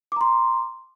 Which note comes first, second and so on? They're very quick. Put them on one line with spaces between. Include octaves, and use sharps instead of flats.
D6 A#5 C6